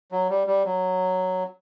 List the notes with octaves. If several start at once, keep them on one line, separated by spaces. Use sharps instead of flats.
F#3
G3
G3
F#3